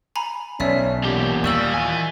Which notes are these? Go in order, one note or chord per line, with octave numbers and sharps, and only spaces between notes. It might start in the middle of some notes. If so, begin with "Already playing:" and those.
G#5 A#5 B5
B1 C#4 D5 E5 B6
E2 A#2 G4
D#2 G3 C#6 E6 F#7
E3 G#5